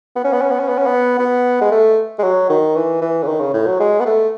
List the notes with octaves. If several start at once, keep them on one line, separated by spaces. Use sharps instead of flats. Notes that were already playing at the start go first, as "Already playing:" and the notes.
B3
C#4
B3
C#4
B3
C#4
B3
C#4
B3
B3
G#3
A3
G#3
F#3
D#3
E3
E3
C#3
D#3
C#3
A2
F#3
G#3
B3
A3